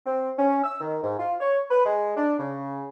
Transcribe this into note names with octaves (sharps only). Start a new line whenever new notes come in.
C4
C#4
E6
D#3
G#2
F4
C#5
B4
G#3
D4
C#3